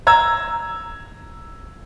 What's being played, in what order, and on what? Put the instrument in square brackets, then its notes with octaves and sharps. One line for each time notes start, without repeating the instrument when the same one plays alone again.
[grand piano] A#5 E6 G#6